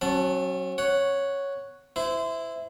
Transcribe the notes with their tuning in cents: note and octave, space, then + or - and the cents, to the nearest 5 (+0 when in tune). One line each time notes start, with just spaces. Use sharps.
F#3 +10 C#4 -40 A5 -10
C#5 +0 F#5 +0
E4 +0 C5 -30